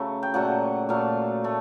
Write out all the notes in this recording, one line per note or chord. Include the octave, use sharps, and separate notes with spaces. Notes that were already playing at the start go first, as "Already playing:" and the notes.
Already playing: C#3 F#3 A3
G5
A#2 F#3 A3 F#5
A#2 F#3 A3 F5
A3